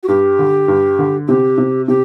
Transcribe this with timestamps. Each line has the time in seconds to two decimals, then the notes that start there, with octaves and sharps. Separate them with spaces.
0.03 F#4
0.08 G2 G4
0.39 D3
0.68 G2
0.99 D3
1.28 C3 G4
1.58 C3
1.88 C3 G4